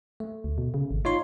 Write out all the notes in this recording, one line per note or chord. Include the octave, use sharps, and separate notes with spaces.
A3
D2
B2
C#3
G#1
D#4 F4 C#5 C6